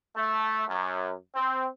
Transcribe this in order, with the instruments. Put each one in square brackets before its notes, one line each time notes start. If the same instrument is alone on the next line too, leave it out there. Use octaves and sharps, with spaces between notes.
[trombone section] A3
F#2
C4